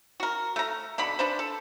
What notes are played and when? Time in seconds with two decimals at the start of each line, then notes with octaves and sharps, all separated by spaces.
0.20 F#4 A#4
0.56 A3 A#5
0.98 B2 D3 B3 B5
1.19 D4 B4 C5
1.39 A4